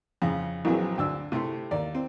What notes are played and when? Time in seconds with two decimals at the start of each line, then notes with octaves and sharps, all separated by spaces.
0.22 F2 C#3
0.65 A#1 E3 F#3 C4 G#4
0.98 D2 D4 E6
1.32 C3 A3 E4 C6
1.71 D#2 D5
1.95 C4